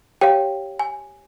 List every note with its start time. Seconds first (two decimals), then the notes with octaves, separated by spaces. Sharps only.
0.21 G4 C#5 F5 G5
0.80 G#5